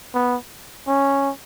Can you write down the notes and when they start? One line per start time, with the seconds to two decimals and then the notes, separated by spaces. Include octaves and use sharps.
0.14 B3
0.87 C#4